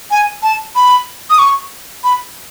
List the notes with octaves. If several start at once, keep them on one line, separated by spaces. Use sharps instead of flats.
G#5
A5
B5
D#6
C#6
B5